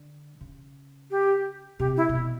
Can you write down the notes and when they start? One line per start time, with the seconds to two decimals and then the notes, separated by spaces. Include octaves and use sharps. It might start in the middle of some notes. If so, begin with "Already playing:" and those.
Already playing: D3
0.41 C#3
1.11 G4
1.79 C3 G4
1.97 E4
2.09 C3
2.15 B2